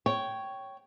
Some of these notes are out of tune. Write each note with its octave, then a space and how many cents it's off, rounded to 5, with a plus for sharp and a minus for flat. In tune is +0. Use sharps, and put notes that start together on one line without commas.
C#5 +0 G5 -10